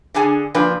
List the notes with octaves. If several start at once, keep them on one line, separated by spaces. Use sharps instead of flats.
D3 D4 G#4 G#5
A#2 F3 D4 B4